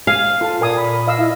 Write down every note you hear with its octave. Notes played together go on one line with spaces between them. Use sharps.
F5 G#5
F4 A4 A5
A#2 A#4 G#5 D#6
B5
D#5 F5 E6
E4